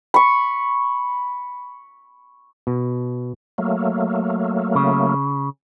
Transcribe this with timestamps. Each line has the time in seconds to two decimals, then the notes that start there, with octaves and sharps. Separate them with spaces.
0.14 B5 C#6
2.67 B2
3.58 F#3 A3 A#3
4.75 C#3